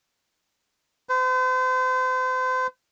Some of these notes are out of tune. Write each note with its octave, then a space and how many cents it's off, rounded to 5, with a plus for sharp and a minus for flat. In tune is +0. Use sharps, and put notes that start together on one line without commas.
C5 -40